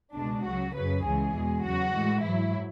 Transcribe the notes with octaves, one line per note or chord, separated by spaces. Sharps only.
C#2 B2 G#3 D4
C#2 C#3 F#3 F#4
F#2 C#3 F#3 B4
C#2 C#3 E3 G#3 G#4
E2 B2 G#3
E2 C#3 F#3 F#4
A2 E3 G#3
G#2 F#3 E4